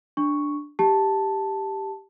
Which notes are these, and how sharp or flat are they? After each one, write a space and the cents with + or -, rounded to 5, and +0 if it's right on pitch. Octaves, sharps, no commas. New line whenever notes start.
D4 +0 C#6 +0
G4 +0 A5 +0